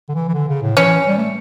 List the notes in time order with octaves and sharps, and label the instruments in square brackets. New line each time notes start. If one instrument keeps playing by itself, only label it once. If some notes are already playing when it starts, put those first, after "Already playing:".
[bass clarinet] D3
E3
E3
D3
C#3
A2
[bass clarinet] E3 [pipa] C#4
[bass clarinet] E3
G3
A3